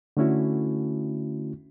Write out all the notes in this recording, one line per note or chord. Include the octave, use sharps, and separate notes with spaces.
D3 A3 C#4 E4 F#4